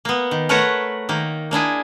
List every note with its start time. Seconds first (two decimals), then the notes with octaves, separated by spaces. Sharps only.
0.05 A#3 B3
0.31 D#3
0.49 A3 A#4 B4 C#5 F#5 A#5
1.09 D#3 A#3
1.51 A#3 D4 E4 G#4